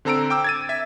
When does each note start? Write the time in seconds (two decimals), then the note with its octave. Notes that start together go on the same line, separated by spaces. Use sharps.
0.05 D3 C4 A4 A#5 E6 D7
0.30 G5 D6 E6
0.44 G#6 A6 D#7
0.69 E5